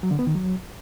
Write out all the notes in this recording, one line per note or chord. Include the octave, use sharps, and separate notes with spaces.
F#3
D3
B3
D#3
F#3